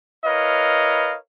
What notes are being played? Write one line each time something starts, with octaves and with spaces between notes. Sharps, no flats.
E4 A#4 B4 C#5 D#5 F5